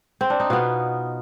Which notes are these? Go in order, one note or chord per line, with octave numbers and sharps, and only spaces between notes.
C4
D4
D#4
B2 B3 F4